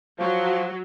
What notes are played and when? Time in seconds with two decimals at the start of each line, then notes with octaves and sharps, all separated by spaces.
0.19 F3 F#3